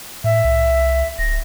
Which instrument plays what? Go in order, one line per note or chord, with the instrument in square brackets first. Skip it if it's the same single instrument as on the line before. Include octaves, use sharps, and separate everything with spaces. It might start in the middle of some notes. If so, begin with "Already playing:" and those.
[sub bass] A2 [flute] E5
[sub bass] C2
[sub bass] D1 [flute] A#6